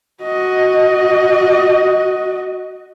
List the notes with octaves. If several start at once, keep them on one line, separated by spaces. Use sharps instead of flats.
F#4 D#5